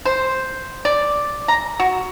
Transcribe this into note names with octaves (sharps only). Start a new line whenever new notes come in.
C5
D5
A#5
F#4